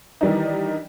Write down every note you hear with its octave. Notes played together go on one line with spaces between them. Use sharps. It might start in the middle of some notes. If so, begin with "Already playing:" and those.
D#3 E3 G3 D4 D#4